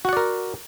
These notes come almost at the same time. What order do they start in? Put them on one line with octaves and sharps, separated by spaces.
F#4 F#5 D5 A#4